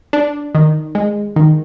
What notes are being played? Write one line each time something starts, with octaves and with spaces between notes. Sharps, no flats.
D4
D#3
G#3
D#3